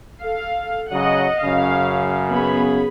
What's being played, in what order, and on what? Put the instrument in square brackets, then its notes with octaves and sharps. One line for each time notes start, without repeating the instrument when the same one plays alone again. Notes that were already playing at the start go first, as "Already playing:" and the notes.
[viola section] A4 F5
[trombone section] C#3 F#3 [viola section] D#5 F#5
[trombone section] F#2 C#3 [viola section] F5
[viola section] B3 G#4 B5